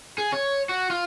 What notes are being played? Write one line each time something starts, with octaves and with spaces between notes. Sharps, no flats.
G#4
C#5
F#4
F4